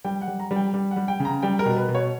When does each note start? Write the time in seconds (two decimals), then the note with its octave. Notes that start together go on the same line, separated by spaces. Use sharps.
0.04 G3 G5
0.21 F#5
0.28 G3
0.40 A#5
0.51 G3
0.56 G5
0.74 G3
0.91 F#5
0.96 G3
1.08 G5
1.20 C#3
1.25 A#5
1.43 G3 G5
1.59 A#4
1.66 B2
1.77 B4
1.88 B2
1.95 C#5